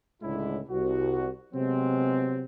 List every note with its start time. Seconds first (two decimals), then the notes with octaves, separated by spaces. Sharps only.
0.21 C#2 A2 D3 G#3 E4
0.69 C2 F#4
1.53 C3 F#3 G#3 B3 C4